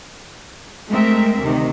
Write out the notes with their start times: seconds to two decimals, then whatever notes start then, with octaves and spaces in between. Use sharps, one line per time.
0.90 G#3 A3 C4 A#4 E5
1.41 D2 C3 D#3